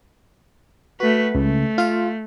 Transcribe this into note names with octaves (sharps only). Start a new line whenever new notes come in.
A3 F#4 B4
C#2 A3
F4 F5